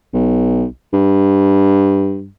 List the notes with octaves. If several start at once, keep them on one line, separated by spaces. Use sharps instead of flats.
B1
G2